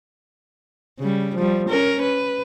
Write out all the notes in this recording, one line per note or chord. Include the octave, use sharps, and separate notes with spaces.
C#3 G3
F3 G3
C#4 A#4
B4